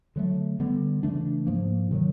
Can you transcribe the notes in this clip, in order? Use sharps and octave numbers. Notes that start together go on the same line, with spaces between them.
D3 F#3 A3
D3 G3 B3
C#3 E3 A3 D4
G#2 F3 A#3
C3 D#3 F#3